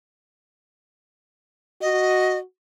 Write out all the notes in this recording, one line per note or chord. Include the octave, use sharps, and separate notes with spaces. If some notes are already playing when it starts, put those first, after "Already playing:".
F#4 D#5